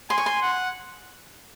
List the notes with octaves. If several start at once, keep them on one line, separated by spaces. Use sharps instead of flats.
G#5 C6
C#6
C6
F#5